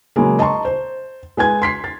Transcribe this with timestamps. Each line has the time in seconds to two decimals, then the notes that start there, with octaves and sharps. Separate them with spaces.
0.16 C#3 F#3 G#3 A#3
0.39 D#5 A5 A#5 C6 C#6
0.65 C5
1.37 G#3 B4 G#5 G#6
1.62 C6 B6 C7
1.84 A6